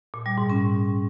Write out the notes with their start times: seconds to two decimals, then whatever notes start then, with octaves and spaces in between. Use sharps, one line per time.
0.14 A#2
0.26 G3
0.38 G#2
0.50 C#4